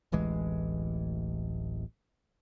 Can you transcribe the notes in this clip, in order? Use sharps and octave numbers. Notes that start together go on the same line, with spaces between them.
D1 A1 E3 G#3